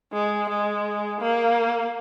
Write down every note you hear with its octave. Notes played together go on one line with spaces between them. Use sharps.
G#3
G#3
A#3